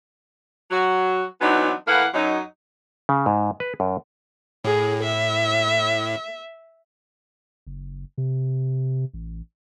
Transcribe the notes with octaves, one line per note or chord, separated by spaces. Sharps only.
F#3 F#4
E3 F#3 B3 C4 D4 D#4
A2 E3 A#3 F5 F#5
F#2 F#3 D#4
C#3
G#2
B4
F#2
A2 G#4
E5
F#1
C3
A1